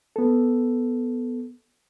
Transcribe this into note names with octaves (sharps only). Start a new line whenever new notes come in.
B3 A4